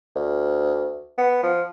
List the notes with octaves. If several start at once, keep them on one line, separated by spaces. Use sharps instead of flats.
D2
B3
F3